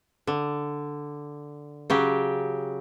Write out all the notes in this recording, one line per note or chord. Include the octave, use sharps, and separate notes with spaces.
D3
C#3 F#3 G4